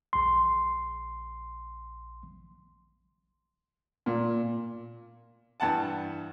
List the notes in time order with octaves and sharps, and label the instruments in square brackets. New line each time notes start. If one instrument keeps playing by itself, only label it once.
[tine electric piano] A#1 C6
[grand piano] A#2
[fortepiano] G2 E3 F#5 A5